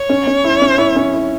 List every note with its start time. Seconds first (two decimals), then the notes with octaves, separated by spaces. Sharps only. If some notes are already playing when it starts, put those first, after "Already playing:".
Already playing: C#5
0.09 C#4
0.27 C#4
0.44 E4
0.62 C#4
0.78 E4
0.96 C#4
1.14 E4